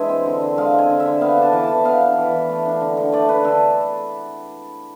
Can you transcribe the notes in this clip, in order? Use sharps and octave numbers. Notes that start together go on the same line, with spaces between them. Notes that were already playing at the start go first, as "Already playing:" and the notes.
Already playing: E3 G#3 D4 E5 G#5
C4
D3
D3
G#3 F5
C4 G#5
D3
E5
D3
B3 F5
D4 A5
E3
A5
E3
B3 F5
D4
E3
E3
A3
D4
D3
D3
A3 D5
D4 B4
D3 A4